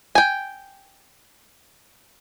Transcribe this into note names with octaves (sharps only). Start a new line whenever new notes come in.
G5 G#5